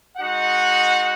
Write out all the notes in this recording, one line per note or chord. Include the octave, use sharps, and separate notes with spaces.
G#3 D#4 F#4 F#5